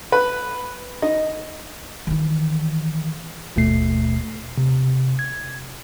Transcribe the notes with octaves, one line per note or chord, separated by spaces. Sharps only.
B4
D#4
D#3 E3
G1 D#2 B2 A3 C7
C3
G#6